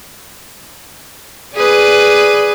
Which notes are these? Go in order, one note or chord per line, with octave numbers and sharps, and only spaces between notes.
G#4 B4 D5